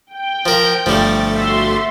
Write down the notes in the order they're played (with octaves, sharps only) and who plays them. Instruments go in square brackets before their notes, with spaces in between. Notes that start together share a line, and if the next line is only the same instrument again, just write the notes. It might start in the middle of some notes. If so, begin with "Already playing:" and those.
[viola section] G5
[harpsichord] F3 A#4
[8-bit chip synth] G1 A3 A6 [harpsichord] F3 G3
[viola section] F#4 E5 C6